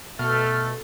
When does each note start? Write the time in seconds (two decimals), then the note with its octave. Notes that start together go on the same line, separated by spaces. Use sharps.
0.19 B2 A3 A4 F6